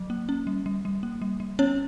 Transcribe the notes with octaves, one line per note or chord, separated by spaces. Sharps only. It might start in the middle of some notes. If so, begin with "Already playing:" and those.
Already playing: F#3
A#3
C#4
G3
G3
G3
A#3
G3
G3
B3 C#4 C#5